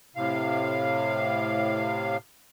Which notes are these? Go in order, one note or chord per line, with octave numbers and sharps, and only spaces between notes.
A2 C3 F5